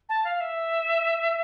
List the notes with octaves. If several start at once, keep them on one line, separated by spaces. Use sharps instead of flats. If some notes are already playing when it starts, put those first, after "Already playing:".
A5
F5
E5